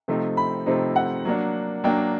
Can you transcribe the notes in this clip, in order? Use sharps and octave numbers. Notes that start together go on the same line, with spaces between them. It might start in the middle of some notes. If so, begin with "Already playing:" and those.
C3 F3 A3 C4 D#4
B5
C3 F3 A3 C4 D#4
F#5
F#3 A#3 D4
F#3 A#3 D4 G5